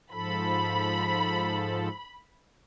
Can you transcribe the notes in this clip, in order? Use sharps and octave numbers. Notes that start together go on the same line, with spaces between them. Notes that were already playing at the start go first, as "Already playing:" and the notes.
G#2 F3 A4 B5